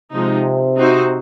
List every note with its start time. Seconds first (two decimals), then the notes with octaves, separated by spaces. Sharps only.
0.13 C3 F3 G#3 D#4
0.76 C4 D#4 F#4 C5